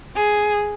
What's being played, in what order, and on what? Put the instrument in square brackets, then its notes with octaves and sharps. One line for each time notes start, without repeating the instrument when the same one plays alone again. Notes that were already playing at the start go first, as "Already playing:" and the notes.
[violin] G#4